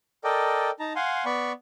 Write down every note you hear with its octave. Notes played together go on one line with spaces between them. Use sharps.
A4 A#4 D5 D#5 G5
D#4 A5 A#5
F5 F#5 G#5 C6
B3 D5 B5 C#6